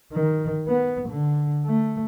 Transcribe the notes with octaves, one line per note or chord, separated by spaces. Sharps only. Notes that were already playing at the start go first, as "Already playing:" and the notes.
D#3
B3
D3
A3